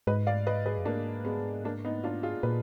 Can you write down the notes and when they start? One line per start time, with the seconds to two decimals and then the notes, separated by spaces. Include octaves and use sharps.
0.07 G#2 B4 D#5
0.27 D5 F5
0.47 B4 D#5
0.66 G#4 B4
0.78 F#2
0.85 G#2 A#3 D4
1.25 G#3 B3
1.65 A#3 D4
1.85 B3 D#4
2.04 D4 F4
2.23 F4 G#4
2.43 A#2 G#4 B4